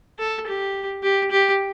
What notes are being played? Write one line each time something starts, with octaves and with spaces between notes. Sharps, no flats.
A4
G4
G4
G4